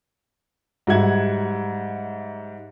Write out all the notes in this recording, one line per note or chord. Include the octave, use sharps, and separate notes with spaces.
G#2 F#3 G3 E5 F#5 G#6